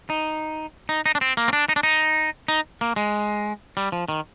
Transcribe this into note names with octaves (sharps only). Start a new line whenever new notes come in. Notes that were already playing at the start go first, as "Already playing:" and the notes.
D#4
D#4
D#4
D4
C4
A#3
C4
D4
D#4
D4
D#4
D#4
A#3
G#3
G3
F3
D#3